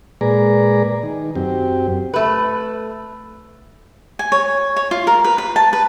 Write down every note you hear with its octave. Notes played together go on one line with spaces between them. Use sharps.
A#2 G#3 G#4 B4 D5 A#5
D#3
F#2 C4 G4
A3 B4
G#5
C#5
C#5
F4
A#4
B4
B4
A5
B4